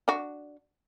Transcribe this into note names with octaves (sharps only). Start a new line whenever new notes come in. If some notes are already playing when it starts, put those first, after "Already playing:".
D4 F#4